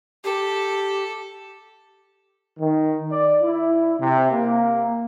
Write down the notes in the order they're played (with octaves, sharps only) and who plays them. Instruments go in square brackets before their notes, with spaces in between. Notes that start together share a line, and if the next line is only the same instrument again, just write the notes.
[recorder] G4 [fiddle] A4
[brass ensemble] D#3
D5
E4
C3
A#3